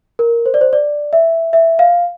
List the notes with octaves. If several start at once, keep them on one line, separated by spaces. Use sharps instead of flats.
A#4
C5
D5
C5
D5
E5
E5
F5